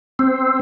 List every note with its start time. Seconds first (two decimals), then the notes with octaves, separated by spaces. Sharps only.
0.19 C4